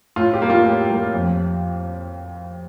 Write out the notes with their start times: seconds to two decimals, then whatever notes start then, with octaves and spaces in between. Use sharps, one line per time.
0.16 A2 F4
0.33 G4
0.42 G3 A#3
0.50 F4
0.66 A2 G4
0.90 G3 A#3
1.14 F2